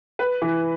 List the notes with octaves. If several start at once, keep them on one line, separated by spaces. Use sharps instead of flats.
B4
E3